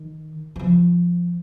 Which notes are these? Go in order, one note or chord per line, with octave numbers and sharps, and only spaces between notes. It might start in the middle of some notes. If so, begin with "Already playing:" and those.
Already playing: D#3
E3
F3